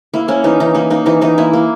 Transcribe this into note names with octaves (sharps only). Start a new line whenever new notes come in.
A#3 E4
A#3 C#4
E3 D#4
E3 D#4
A#3 D#4
A#3 D#4
E3 D#4
E3 D#4
A#3 E4
A#3